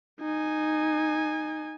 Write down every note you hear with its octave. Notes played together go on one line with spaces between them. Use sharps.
D#4 G#5